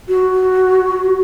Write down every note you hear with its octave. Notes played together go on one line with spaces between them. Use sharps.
F#4